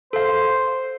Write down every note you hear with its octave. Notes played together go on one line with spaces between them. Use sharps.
A4 C5 F5